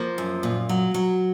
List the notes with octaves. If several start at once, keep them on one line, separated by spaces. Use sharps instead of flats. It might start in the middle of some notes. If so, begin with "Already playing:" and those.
Already playing: F3 A#3
F#2
A#2
F#3
F#3